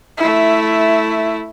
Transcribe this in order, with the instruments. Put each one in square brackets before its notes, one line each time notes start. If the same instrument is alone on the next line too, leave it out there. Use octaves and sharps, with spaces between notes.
[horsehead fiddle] A3 E4